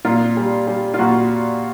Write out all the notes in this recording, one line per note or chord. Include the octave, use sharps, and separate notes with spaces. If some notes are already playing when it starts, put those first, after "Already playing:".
A#2 F4
G3
G3
F4
A#2 F#4